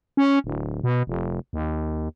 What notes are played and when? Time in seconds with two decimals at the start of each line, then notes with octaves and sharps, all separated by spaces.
0.17 C#4
0.44 D1
0.83 B2
1.07 F1
1.53 D#2